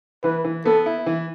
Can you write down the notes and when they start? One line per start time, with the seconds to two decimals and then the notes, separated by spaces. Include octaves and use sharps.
0.24 E3 B4
0.44 E3
0.66 B3 A4
0.86 E4
1.06 E3